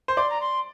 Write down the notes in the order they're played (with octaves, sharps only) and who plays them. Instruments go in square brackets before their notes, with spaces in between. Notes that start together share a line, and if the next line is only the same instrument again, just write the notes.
[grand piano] C5
[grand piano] D5 [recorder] C6
[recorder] A#5
C6